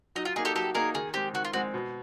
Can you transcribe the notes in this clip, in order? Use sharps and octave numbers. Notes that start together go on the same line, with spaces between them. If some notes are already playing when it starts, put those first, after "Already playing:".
F#3 D#4
F4
A#3 D#4 G#4
G4 A4
F#3 G4 A4
A#3 D#4 G#4 A#4
D#3 G#4
G#3 C4 G4
D#3 F#4
F4
G#3 C4 F#4
B2